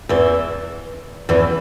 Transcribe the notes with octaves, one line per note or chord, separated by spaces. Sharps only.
E2 E3
E2 E3